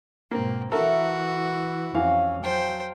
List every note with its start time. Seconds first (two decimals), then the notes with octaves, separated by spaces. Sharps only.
0.31 G#2 B2 A#3 C4
0.72 E3 E4 F#4 A4 A#4 E5
1.95 F2 E3 C#4 F5
2.43 F#3 C5 G5 A5